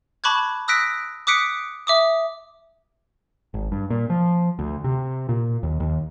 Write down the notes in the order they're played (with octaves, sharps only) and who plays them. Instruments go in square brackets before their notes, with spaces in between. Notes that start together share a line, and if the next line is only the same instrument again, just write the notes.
[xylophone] A5 B5 C#6 D6 F#6 G#6
D#6 E6 F#6 A#6 B6 D7
D6 D#6 F#6 B6 C#7 D7
E5 D6 D#6
[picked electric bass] G#1
G2
A#2
F3
D2
C3
A#2
D#2
D#2